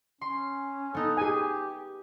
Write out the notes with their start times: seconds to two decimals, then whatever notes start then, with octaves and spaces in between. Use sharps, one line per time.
0.21 C#4 C6
0.95 B3 D#4 A4
1.17 G4 G#4 G#5